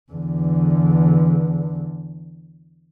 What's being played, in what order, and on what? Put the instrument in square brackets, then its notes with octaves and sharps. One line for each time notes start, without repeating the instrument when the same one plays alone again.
[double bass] E2 D3